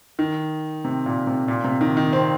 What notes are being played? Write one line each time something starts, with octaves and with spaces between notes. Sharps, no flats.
D#3
C3
A#2
C3
A#2
C3
D#3
D#3
C4